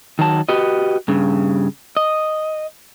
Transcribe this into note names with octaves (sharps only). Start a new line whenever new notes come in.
D#3 F#3 A5
F#4 G4 B4 D#5
G2 C#3
D#5